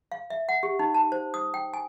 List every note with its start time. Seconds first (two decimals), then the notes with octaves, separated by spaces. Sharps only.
0.12 F5
0.30 E5
0.49 F#5
0.63 G4
0.79 D#4
0.94 A5
1.12 C5
1.34 D#6
1.54 G5
1.74 G#5